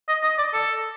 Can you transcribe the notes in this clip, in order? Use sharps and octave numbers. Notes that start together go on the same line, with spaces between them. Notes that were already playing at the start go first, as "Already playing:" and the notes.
D#5
D#5
D5
A4